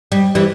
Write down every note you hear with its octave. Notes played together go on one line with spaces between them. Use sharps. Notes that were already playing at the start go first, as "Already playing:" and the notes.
G3
E3 G3